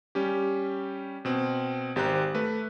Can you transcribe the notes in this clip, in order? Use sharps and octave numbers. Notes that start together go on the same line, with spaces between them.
G3 C#4 G4
B2 C4
G#1 G4 C5 A#5 F#6
A3 B4